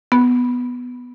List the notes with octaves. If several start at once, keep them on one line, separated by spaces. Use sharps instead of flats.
B3